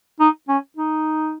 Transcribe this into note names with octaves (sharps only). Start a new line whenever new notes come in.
D#4
C#4
D#4